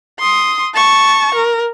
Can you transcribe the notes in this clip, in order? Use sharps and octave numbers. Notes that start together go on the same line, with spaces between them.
C6 D#6
A5 C#6
A#4